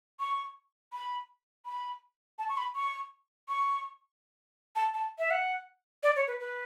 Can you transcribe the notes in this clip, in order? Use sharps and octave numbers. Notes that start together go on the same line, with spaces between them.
C#6
B5
B5
A5
C#6
B5
C#6
C#6
A5
A5
E5
F#5
D5
C#5
B4
B4